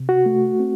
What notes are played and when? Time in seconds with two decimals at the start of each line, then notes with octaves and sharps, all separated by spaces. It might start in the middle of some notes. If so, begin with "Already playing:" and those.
Already playing: C3
0.09 F#4
0.26 A3
0.60 C4